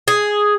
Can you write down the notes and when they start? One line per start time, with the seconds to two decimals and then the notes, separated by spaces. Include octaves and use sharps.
0.08 G#4